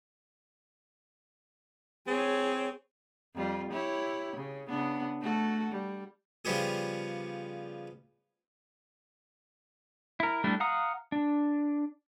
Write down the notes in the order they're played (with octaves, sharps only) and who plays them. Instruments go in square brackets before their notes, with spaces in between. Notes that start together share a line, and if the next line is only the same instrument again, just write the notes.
[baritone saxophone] C4 [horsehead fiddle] G#4 C#5
[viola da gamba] F2 G3 F4
E4 G4 C#5
C#3
C#3 B3 D4
A3 F#4 A4
G3
[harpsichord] C#3 F3 G3 B3 G4 G#4
[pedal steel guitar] E4 A#4
G3 A3 D4 E4
F5 F#5 A#5 D#6
D4